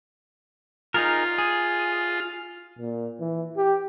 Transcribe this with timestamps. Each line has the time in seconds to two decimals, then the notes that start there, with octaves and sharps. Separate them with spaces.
0.94 D#4 F4 G#4 A#4
1.38 G#4
2.79 A#2
3.20 E3
3.57 G4